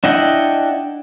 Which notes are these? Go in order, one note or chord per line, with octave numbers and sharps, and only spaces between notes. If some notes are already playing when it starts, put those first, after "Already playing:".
D4 E4 D#5 F#5 G5